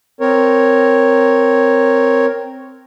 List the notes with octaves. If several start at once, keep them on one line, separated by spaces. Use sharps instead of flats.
C4 A#4 C#5